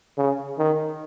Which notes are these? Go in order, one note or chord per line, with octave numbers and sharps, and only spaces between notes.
C#3
D#3